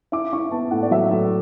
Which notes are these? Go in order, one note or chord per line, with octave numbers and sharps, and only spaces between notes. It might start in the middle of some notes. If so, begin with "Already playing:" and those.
E4 D6
E4 C#6
B3 A5
A2 F#5
D5
F#3 E5
A2